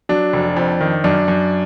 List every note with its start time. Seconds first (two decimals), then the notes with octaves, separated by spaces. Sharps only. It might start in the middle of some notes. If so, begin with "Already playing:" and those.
0.09 F#3 D4
0.33 F1
0.57 F2
0.80 D#3
1.04 F#2 D4
1.28 F#2